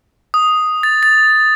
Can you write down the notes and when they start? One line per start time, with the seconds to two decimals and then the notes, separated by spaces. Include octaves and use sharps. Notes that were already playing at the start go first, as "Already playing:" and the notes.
0.34 D#6
0.83 A6
1.03 A6